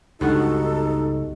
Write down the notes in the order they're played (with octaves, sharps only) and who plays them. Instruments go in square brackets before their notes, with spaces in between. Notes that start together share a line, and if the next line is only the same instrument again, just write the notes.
[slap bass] C#2 [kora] G2 B3 F#4 [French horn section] D#4 [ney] A4